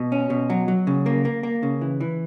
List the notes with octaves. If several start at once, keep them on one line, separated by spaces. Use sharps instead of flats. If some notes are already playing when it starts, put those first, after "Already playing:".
Already playing: B2
C#4
B2
F#3
F#3
C#3
A#3
A#3
A#3
C#3
E3
E3